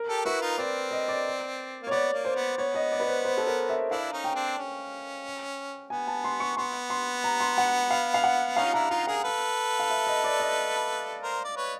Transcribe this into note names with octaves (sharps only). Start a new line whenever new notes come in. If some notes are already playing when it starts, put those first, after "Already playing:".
Already playing: A#4
G4 A4
E4 F#4 B4
D#4 F4
C4 D5
D#5
D5
A#3
C#5
B3 D5
A#3
C5
B3
B3 C#5
D#5
D5
B4
C5
C5
A4
A#4
E5
D4 E4 F5
C#4 D#4
G5
C4 D4
C#4
B3 G#5
A5
C6
C#6
B3 C6
C6
A#5
C6
F#5
F5
F5
F#5
C#4 D#4 F5
F4
D4 E4 A#5
D#4 F4 A#5
G#4 A#4 F5
A4 B4
F5
E5
D#5
D5
D#5
A#4 C5
D5
B4 C#5